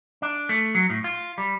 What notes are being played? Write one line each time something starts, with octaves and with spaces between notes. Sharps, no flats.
D4
A3
F#3
A2
F4
G3